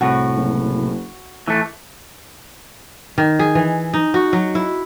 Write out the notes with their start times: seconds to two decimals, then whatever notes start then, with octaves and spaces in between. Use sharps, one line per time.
0.01 C2 A2 F#4
0.36 F#1
1.48 A2 E3 A3
3.18 D#3
3.39 G#4
3.55 E3
3.93 D#4
4.14 F#4
4.33 F#3
4.55 E4